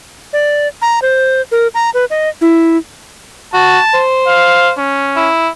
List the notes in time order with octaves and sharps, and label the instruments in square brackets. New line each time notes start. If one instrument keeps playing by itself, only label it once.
[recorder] D5
A#5
C5
A#4
A#5
B4
D#5
E4
[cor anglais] F#4 [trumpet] A5
[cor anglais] C5
[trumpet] F5
C#4
[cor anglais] E4